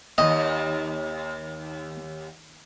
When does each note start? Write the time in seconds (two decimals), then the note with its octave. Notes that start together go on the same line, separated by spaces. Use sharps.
0.18 D#2 D#5